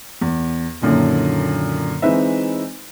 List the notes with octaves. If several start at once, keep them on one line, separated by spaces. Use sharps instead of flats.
E2
F#2 A#2 D3 D#3
E3 G#3 C4 D#4 B4 E5